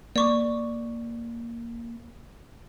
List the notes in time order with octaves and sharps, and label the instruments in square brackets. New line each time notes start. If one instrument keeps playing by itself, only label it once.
[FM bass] A#3 [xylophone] D5 C#6 D6